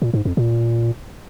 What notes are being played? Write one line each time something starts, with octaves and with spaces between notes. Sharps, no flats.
A#2
G#2
F2
A#2